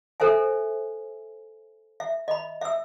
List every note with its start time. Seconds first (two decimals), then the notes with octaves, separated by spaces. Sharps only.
0.20 A4 A#4 C5 E5 G#5
2.00 E5
2.28 D#5 B5
2.61 E5 E6